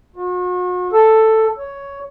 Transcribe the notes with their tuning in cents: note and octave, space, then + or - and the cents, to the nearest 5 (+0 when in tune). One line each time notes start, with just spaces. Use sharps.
F#4 -40
A4 +5
C#5 +10